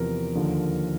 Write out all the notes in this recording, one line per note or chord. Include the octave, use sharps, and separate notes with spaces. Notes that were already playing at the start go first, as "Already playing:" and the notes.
Already playing: E2 C3 F3 A#4
D#2 D3 F3